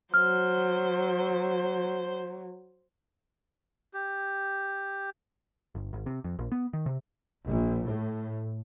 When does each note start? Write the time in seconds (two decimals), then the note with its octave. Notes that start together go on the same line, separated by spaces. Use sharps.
0.14 F#3 C5 F6
3.94 G4
5.75 G1
5.93 G#1
6.06 C3
6.24 F2
6.39 A#1
6.52 B3
6.73 D#3
6.86 C3
7.44 A#1
7.84 A2